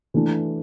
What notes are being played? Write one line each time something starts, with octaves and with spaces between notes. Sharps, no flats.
E3 A3 D4